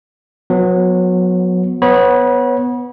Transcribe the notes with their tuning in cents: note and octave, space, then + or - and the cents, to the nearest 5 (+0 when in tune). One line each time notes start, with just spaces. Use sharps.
F#3 -25 B3 +0
B3 +0 C#5 -20 B5 -35